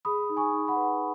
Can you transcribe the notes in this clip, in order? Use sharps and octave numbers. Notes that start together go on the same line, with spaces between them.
G#4 B5 D#6
D#4
G#5 C#6
D#4
F#5 B5
B4